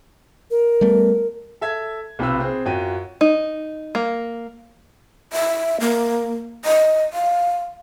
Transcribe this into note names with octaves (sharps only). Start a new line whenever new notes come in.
A#4
G3 A3 B3
A4 E5 G#6
B1 C3 F4 B4 B5 E6
C4 G#4
F#2 F4 F#4 G5 D#7
D#4
A#3
E5
A#3
D#5
F5